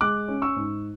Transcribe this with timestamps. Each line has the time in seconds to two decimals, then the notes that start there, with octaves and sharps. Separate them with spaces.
0.01 G#3 D6 F#6
0.28 C#4
0.42 C#6 E6
0.56 G#2